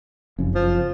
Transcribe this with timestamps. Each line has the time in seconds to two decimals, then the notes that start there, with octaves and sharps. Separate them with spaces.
0.38 F#1 F2 C#3
0.55 F3